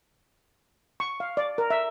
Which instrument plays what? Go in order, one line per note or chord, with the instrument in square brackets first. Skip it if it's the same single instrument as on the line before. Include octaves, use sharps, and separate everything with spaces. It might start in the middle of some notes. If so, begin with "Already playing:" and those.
[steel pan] C#6
F5
D5
A#4
E5